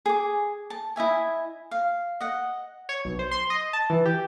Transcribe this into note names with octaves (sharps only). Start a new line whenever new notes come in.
G#4 D6
A5
E4 D#5 E5 G#5
F5
D#5 F#5
C#5
B1
C5
C6
D#5
A5
E3
G4